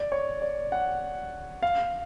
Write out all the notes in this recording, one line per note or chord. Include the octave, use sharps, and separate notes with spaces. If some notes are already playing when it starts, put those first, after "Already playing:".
Already playing: D5
C#5
D5
F#5
F5